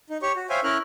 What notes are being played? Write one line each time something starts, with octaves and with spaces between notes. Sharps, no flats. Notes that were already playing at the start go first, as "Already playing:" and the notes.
D#4
G4 C#5 C#6
F#4
C5 C#5 E5 F5 G5 G#5
C#4 E4 A#4 F6 F#6